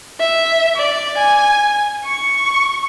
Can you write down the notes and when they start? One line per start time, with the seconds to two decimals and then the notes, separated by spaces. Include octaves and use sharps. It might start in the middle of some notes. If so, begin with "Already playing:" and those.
0.20 E5
0.76 D5
1.18 G#5
2.05 C#6